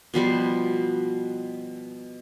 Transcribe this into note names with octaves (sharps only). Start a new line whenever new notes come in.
B2 F3 G3 C5